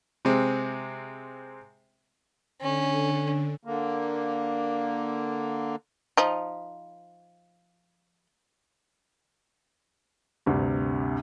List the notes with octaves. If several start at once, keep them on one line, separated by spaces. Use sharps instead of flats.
C3 G#3 C4
D3 C#4
D3 A#3
F3 D#4
D2 G2 C3